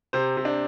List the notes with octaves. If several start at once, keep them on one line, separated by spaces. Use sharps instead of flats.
C3 C5
C3
D4